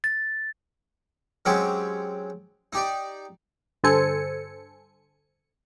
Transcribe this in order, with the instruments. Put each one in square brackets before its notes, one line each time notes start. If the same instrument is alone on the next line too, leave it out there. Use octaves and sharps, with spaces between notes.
[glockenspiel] A6
[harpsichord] F#3 G#3 C4 C#4 G4
D#4 G4 D5
[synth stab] G2 D3 A4 C5 G#5 C#7